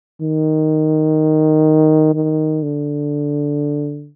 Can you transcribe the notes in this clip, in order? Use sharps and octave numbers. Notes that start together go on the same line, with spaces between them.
D#3
D#3
D3